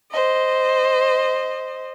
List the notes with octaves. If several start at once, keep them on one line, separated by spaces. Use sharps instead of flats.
C5 D#5